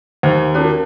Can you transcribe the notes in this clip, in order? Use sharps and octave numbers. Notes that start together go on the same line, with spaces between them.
D#2 C5
C#4 F#4 A#4